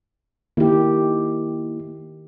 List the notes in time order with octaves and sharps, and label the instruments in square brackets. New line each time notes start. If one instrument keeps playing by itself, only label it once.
[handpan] D#3 G4 [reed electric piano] A#3 E4